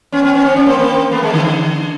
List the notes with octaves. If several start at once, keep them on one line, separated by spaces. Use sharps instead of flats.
B3 C#4
B3 C#4
B3 C#4
C4
C#4
A#3 C4
A#3 C4
A3 B3
G#3 A#3
D3 E3
D3